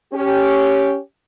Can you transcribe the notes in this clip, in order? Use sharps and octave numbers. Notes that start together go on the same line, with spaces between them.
C#4 G4